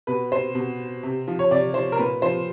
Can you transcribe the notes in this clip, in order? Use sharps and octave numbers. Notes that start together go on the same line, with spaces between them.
B2 B4
C5
B2
C3
F3
C#5
C3 D5
F3 C5
A#4
A#2 B4
F3 C5